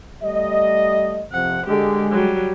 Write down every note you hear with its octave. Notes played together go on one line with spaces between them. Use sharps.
G3 A3 D#5
F2 C3 F3 F#5
D3 G#3 G4
F#3 G3